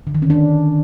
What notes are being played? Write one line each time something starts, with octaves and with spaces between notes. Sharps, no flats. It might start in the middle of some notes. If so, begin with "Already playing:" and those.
D3
D#3
C#4
D4